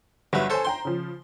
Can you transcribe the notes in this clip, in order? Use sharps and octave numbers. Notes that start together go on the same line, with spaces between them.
G1 F#3 G3 B4 E5
A4 C5 C#5 G#5
C5 G5 A#5 C6
C#3 F3